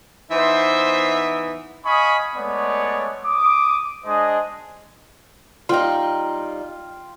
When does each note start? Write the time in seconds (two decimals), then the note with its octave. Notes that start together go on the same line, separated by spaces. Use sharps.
0.31 E3 B3 D#4 C5 E5
1.86 D#5 F5 G#5 B5 C#6 D#6
2.36 G#3 A3 B3 C#5 D5
3.25 D6 D#6
4.05 G#3 D4 G#4 C5 D#5
5.69 G3 D#4 F4 G5